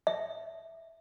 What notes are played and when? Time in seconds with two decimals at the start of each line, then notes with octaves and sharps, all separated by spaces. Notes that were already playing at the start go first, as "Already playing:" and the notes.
0.07 E5